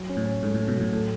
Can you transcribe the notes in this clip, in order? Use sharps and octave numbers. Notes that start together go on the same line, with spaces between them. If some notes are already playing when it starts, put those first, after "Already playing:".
Already playing: F#3
C#4
A2
C#4
G#2 A3
A2
A3
G#2 B2
A2 F#3
A2 A4